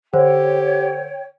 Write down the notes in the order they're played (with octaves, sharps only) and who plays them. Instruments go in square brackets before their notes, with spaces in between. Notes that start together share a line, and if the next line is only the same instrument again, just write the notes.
[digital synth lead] D3 [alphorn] G4 [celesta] C5 [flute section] C#5 G5